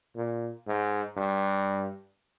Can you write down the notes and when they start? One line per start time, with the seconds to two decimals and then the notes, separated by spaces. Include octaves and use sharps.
0.16 A#2
0.67 G#2
1.17 G2